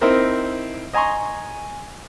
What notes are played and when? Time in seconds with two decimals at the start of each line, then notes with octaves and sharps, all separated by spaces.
0.01 C4 D#4 E4 A#4 C5
0.93 D#5 G#5 A#5 C6 C#6